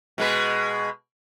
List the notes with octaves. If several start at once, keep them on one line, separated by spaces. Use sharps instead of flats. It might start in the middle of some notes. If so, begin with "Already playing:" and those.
B2 G#3 B4